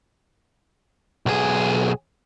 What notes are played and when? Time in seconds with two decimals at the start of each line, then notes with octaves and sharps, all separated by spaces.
1.26 B1 G#4